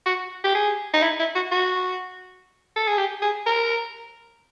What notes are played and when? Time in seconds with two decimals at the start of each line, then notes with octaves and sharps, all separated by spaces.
0.06 F#4
0.44 G4
0.55 G#4
0.94 D#4
1.02 E4
1.19 E4
1.35 F#4
1.52 F#4
2.76 A4
2.87 G#4
2.97 G4
3.22 G#4
3.46 A#4